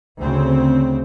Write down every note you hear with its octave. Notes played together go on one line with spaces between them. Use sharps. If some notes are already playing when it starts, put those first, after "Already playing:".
D2 C#3 C4